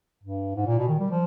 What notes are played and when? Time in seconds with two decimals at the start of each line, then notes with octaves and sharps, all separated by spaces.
0.24 G2
0.56 G#2
0.67 A#2
0.78 B2
0.88 D#3
0.99 G3
1.11 F3